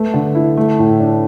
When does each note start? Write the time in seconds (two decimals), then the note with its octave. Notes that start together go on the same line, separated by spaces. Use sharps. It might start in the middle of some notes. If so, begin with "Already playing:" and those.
Already playing: A3 B4
0.14 D3
0.35 E4
0.57 A3
0.79 A2
1.00 D4